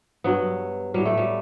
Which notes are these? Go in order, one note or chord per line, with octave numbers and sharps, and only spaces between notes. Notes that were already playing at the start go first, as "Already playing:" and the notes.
G2 F#3 B3
A2 F#3 G3
A3
G3